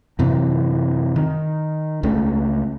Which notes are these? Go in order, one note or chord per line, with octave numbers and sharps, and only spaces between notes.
F#2 C3 E3 C4
D#3
C#2 C#3 A3